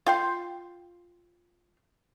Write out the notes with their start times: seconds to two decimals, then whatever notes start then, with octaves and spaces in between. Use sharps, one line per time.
0.06 F4 G5 C6